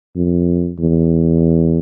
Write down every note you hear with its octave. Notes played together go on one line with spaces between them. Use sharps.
F2
E2